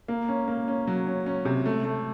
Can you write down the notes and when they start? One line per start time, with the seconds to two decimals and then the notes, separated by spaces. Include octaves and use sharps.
0.08 A#3
0.28 C#4
0.48 A#3
0.68 C#4
0.87 F#3
1.07 C#4
1.26 C#4
1.45 C3
1.66 A3
1.85 A3